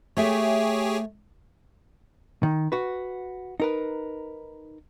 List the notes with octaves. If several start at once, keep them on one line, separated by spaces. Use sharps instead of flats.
A3 G4 G#4 C#5 E5
D#3
F#4 B4
D#4 A#4 B4